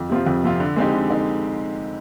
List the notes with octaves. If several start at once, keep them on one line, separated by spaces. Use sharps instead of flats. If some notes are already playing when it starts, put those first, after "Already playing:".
Already playing: F2
C3 F3 C4 F4
F2
C3 F3 C4 F4
D3
G#3 C4 D#4 G4
D3
D#4